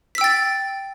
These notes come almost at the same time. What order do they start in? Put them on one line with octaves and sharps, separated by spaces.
B6 E6 G5 A6